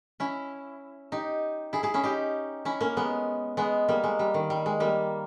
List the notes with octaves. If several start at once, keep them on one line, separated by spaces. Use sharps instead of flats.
C#4 E4
D#4 G4
E4 G#4
E4 G#4
C#4 E4
D#4 G4
C#4 E4
A#3 C#4
G#3 B3
G#3 B3
G3 A#3
G#3
G3
D#3
G3
G#3
G3 A#3